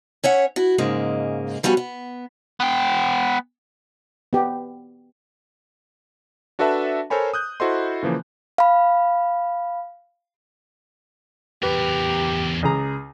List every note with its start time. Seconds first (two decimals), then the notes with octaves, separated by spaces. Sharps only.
0.24 C#4 C#5 E5 F#5
0.56 E4 F#4
0.78 G#2 C#3 G#3 A#3
1.63 F3 G3 B3 C#4 F#4
1.77 B3
2.60 B3 G5
4.33 B3 G4
6.59 D4 F#4 A4 B4 E5 A5
7.10 A4 A#4 C5 C#5 G#5 B5
7.34 D#6 F#6 G6
7.60 E4 F#4 A4 C5 D#5 C6
8.03 C#3 E3 F3 A#3
8.58 F5 B5
11.63 E2 G4 A#4 B4
12.63 C#2 G#4 A#5